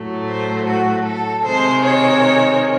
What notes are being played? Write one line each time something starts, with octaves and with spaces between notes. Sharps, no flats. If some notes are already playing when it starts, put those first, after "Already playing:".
Already playing: A2 F#3 A3
C5
F#4
A4
C3 D#3 G#3 C5
C#5